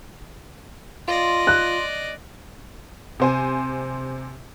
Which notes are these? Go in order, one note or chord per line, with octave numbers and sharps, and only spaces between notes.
F4 D5 D#5 C6
F#6
C3 C5 G#5